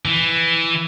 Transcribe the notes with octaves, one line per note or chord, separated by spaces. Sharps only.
E3